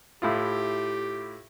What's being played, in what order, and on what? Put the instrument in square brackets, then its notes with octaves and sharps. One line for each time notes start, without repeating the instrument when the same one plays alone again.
[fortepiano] A2 E4 F4 [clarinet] G4